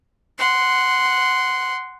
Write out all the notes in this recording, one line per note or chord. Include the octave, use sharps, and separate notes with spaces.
F#5 C6